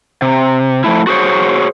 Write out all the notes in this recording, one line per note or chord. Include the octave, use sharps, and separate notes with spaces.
C3
F3 A3 E4
F#4 G#4 C5 C#5